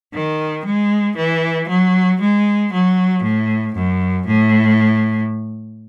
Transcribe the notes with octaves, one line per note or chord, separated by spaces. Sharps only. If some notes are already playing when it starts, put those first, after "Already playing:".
D#3
G#3
E3
F#3
G#3
F#3
A2
F#2
A2